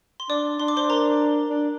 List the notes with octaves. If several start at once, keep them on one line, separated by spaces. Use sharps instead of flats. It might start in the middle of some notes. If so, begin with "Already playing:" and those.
C6
D4 D5 D6
D4 C6
D6
C5 C6
A#4 A#5
D4